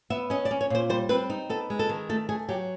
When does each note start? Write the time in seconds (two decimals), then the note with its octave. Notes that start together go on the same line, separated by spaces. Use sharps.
0.10 B3 E5
0.30 C#4 D#5
0.45 D5
0.51 C#4
0.61 C#5
0.70 A#2 C5
0.90 G3 C5
1.09 C4 B4
1.30 D#4
1.49 B3 A4
1.70 G#3
1.79 A4
1.89 D#3
2.09 A3 A4
2.29 A3 G#4
2.49 F#3 G4